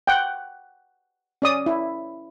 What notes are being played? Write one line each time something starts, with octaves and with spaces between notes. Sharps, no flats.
F#5 G5
C#4 D5 D#6
E4